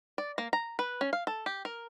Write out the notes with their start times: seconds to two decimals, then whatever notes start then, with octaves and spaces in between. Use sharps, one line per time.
0.18 D5
0.38 A#3
0.53 A#5
0.79 B4
1.01 C#4
1.13 F5
1.27 A4
1.46 G4
1.65 A#4